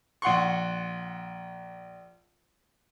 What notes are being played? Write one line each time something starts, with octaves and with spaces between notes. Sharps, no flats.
A#1 F#5 C6 C#6